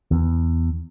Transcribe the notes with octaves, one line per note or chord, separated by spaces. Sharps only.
E2